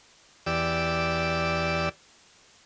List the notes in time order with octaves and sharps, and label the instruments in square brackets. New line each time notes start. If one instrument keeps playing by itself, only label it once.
[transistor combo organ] E2 G4 D5 E6